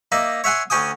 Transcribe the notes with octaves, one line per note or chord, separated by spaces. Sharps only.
A#3 D#4 D5 E5
C#5 E5 F#5 G#5 C6
D2 C#4 G5 G#5 D#6